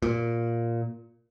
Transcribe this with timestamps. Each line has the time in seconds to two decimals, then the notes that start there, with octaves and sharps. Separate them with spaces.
0.02 A#2